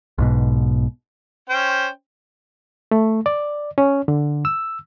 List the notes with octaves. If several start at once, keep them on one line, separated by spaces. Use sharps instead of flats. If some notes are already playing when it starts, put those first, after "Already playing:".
B1 G#2 B2
C#4 C5 G5
A3
D5
C#4
D3
E6